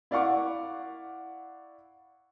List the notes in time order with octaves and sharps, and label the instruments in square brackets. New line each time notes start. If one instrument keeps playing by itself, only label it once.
[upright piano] E4 D5 F5 F#5 C#6 D6